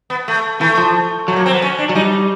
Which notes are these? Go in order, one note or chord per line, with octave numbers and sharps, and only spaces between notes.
B3
A3
E3 A3
F3
F#3 A3
A#3
C4
B3
C#4
D4
F#3
G3 D#4